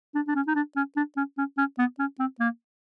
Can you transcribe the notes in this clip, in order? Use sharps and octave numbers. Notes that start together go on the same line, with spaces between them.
D4
D4
C#4
D#4
D4
C#4
D4
C#4
C#4
C#4
B3
C#4
C4
A#3